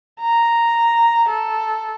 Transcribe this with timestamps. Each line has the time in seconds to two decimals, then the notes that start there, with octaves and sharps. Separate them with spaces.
0.21 A#5
1.30 A4